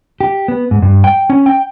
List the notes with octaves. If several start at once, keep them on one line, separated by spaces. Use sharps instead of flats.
G4
B3
G#2
G2
G5
C#4
G5